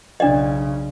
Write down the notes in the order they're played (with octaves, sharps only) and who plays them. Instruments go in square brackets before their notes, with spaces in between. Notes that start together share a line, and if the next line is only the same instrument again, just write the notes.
[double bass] B1 C#3 [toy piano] D4 D5 D#5